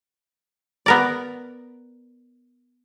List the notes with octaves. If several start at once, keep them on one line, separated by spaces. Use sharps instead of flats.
B3 A#4 D5